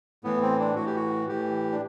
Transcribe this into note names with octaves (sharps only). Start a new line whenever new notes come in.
A2 E3 B3
C4
D4
A2 E3 F#4
G4
F#4
A2 E3 G4
D4